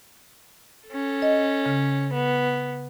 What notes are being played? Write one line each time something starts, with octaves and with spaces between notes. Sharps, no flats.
C#4 A4
D#5
C#3
B3